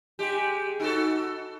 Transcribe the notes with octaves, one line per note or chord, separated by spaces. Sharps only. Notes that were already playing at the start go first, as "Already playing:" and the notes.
G#3 G4
D#4 F#4 A4